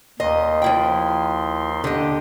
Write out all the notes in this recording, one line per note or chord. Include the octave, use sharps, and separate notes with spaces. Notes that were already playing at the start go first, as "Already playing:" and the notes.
D#2 D#5 C6
F3 E4 G5
D3 G4 D#5